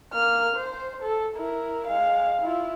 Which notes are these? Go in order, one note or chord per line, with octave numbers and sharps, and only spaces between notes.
A#3 F6
C5
A4
E4 A#4
G#3 F5
E4 F4